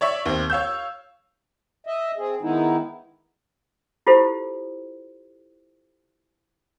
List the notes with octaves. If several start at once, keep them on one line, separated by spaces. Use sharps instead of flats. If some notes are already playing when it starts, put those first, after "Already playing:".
C#5 D5 E5 C#6
D#2 C4
C#5 F5 E6 G6
D#5 E5
C4 G#4
D#3 G#3 B3 D#4 E4
E4 F4 G4 A4 C5